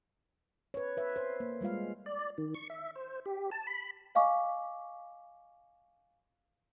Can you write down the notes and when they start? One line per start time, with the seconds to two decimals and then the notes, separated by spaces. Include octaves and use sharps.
0.74 B4 C#5
0.97 B4 E5
1.16 C5
1.40 A#3
1.61 G3 G#3 F4 F5
2.06 D5
2.38 D#3
2.54 C#6
2.70 E5
2.96 C5
3.26 G4
3.52 A5
3.67 B5
4.15 D#5 F5 G#5 C#6 D6